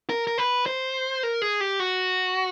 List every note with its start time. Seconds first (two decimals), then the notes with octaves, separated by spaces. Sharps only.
0.10 A#4
0.27 A#4
0.38 B4
0.66 C5
1.23 A#4
1.42 G#4
1.61 G4
1.80 F#4